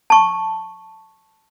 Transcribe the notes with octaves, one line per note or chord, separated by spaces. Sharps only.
A5 C#6